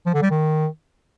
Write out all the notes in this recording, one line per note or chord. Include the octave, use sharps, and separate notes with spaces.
F3
D3
G3
D#3